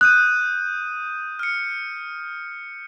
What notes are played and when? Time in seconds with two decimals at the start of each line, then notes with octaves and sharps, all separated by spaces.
0.01 D#6 F#6 G6 D#7
1.39 F6 C#7